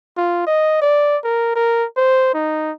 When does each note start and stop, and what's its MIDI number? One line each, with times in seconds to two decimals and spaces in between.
0.17 0.43 65
0.46 0.80 75
0.82 1.17 74
1.24 1.51 70
1.56 1.85 70
1.97 2.33 72
2.34 2.72 63